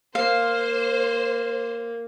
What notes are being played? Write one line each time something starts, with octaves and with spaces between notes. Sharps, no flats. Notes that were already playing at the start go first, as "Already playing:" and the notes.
A#3 C5 F5